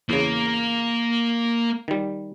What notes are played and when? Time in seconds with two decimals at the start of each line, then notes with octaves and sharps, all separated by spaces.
0.10 E2 C#3 A#3
1.88 D#3 G3